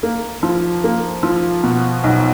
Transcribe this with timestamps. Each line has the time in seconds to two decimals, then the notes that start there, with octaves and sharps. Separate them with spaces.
0.03 A#3
0.43 F3
0.84 A#3
1.23 F3
1.63 B2
2.04 B1